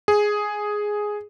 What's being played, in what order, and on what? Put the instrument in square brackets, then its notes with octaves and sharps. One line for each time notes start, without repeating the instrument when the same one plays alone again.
[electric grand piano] G#4